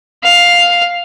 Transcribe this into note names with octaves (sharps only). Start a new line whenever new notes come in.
F5